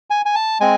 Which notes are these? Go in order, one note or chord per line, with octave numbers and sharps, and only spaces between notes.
G#5
G#5
A5
G#3 C4 G#5